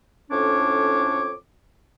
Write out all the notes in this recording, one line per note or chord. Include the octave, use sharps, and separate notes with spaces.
F2 A2 C#4 D4 C#5 D6